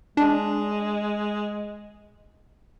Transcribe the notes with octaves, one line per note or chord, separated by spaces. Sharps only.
G#3 D4